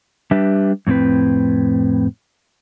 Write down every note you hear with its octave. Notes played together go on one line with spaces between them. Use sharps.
G3 D4 G4 B4 E5
F2 A2 D3 C4 B4